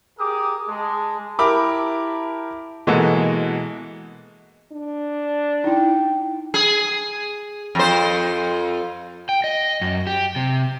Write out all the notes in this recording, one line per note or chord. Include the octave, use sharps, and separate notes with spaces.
G4 G#4 A#4 D6 D#6
G#3 A5
E4 G4 A#4 A5 B5 D6
B2 E3 G#3 A#3 F#4 A4
D4
D#4 E4 G5
G#4
F2 C5
G5
D#5
F#2
G4
C3